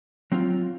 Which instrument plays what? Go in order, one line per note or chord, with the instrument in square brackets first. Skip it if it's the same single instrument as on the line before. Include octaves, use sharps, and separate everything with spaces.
[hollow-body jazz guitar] F#3 C4 F4